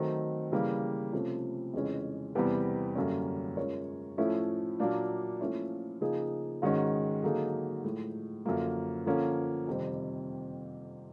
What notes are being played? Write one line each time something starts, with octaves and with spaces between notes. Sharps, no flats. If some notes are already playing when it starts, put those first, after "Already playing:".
Already playing: D#3 F#3 A3 C4
C#3 E3 G3 A#3
C3 F3 A3 C#4
F2 C#3 E3 G#3 C#4
E2 C3 E3 G3 B3
F#2 D3 G3 A#3 C#4
G#3 C#4 F4 A#4 C#5
A2 F3 A3 C#4 E4
A#2 F#3 A#3 D4
A#2 F3 A3 C#4 E4
C#3 F3 A#3 D#4 G#4
G#2 D#3 G#3 C#4 F#4
D3 F#3 A#3 D#4 G#4
A2 F3 G#3
F#2 D3 F3 A#3
D3 F3 A#3 C#4
F2 C3 D#3 G3 C4